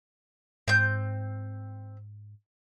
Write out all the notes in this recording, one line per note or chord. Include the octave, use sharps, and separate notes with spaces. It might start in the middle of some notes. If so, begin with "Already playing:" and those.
G#2 C4 G6